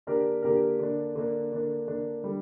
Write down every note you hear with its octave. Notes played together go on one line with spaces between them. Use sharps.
D3 A#3 D4 G4 A#4
D3 A#3 D4 G4 A#4
D3 A#3 D4
D3 A#3 D4
D3 A#3 D4
D3 A#3 D4
D3 G3